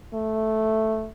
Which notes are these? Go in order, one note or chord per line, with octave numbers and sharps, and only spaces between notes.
A3